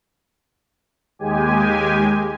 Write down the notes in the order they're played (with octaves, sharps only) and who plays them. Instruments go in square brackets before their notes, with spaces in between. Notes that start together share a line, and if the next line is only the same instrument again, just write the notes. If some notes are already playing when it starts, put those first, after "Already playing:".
[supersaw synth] D#2 G#3 G4 G#5